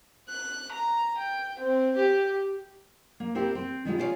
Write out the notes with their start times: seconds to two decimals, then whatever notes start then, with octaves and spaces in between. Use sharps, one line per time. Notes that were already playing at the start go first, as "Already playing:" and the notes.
0.29 F#6
0.72 A#5
1.18 G5
1.59 C4
1.96 G4
3.20 A#3
3.35 C4 E4 G4 A#4 C5
3.55 C4 C5
3.85 D#3 G3 G#3 C#4 E4 F4
3.98 F4 G4 G#4 C5 C#5 F5